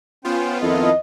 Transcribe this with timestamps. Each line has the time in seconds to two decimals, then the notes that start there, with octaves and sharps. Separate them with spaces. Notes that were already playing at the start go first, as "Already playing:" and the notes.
0.25 B3 C#4 F4 C5 G5
0.62 F2 D#3 E4 A4 D#5